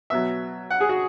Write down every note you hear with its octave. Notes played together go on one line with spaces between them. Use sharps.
B2 F#3 E5
F#5
G#4
F#4